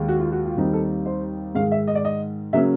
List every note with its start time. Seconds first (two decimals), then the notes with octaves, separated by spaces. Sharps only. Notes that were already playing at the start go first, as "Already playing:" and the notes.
Already playing: D#2 D#3 G#3
0.08 F#4
0.20 F4
0.32 F#4
0.45 F4
0.57 D#2 D#3 G3 C4 D#4
0.73 A4
1.06 C5
1.55 G#2 D#3 G#3 F5
1.72 E5
1.87 D#5
1.95 D5
2.05 D#5
2.53 C#3 F#3 A#3 C#4 E5